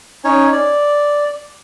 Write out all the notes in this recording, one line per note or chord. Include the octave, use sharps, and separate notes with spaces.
C#4 D#4 C#5
D5